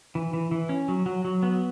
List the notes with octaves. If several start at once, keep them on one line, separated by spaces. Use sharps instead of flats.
E3
E3
E3
C#4
F#3
F#3
F#3
B3